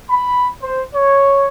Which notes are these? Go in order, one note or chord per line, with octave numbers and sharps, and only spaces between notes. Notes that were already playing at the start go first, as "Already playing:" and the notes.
B5
C5
C#5